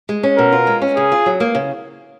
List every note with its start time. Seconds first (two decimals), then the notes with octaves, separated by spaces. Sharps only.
0.09 G#3
0.23 C#4
0.38 B2 A#4
0.52 F4
0.67 G#3
0.82 C#4
0.96 C#3 G#4
1.12 F4
1.26 F#3
1.40 A#3
1.55 C#3